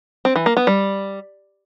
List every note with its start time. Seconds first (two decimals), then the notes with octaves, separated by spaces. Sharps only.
0.25 C4
0.36 E3
0.46 A#3
0.57 B3
0.67 G3